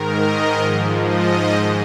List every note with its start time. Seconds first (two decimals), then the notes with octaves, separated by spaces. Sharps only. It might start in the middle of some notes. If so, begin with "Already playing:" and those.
Already playing: G#2 D#3 A#4
0.11 D#5
0.59 G#2 F3
1.06 D#5
1.52 G#2 D#3